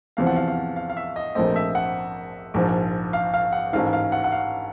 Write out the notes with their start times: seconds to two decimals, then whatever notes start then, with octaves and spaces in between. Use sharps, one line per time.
0.17 E2 C3 F3 F5
0.27 F#5
0.36 F5
0.48 F5
0.76 F5
0.90 F5
0.97 E5
1.16 D#5
1.35 A#1 A#2 F3 A3 C4 D#5
1.56 E5
1.75 F#5
2.54 A#1 G#2 F3
3.13 F5
3.34 F5
3.53 F#5
3.73 A1 G#2 D#3 F5
3.93 F5
4.12 F#5
4.24 F#5
4.32 F5